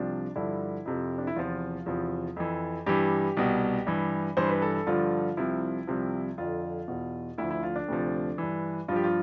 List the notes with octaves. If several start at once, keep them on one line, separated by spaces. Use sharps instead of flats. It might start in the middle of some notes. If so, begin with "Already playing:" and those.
Already playing: C2 C3 F3 D4
G2 D3 F3 E4
F2 C3 F3
D4
E4
E2 C3 F3 F4
E2 C3 F3
F2 E3
G2 E3 G4
C2 B2
G2 E3
G2 E3 C5
B4
A4
A4
G2 D3 F3 F4
C2 C3 F3 E4
C2 C3 F3
F2 D3 F3 F4
E2 B2
D2 D3 F3 E4
E4
F4
D4
D2 C3 F3
G2 E3
G2 F3 F4 G4
F4